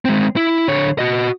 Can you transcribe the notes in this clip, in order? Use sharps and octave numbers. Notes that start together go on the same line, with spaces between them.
G#3 C4
E4
D3 C#5
F#4 D#5